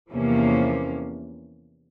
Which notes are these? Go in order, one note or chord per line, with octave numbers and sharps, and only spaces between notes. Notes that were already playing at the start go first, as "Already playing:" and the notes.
E2 C3 F3 A#3 C#4